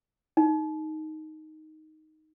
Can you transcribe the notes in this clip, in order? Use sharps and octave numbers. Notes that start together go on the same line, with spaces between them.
D#4